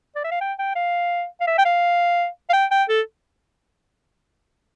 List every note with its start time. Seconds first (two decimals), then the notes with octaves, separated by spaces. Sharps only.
0.16 D5
0.24 E5
0.31 F5
0.41 G5
0.59 G5
0.75 F5
1.40 F5
1.47 E5
1.58 G5
1.65 F5
2.49 F5
2.53 G5
2.71 G5
2.89 A4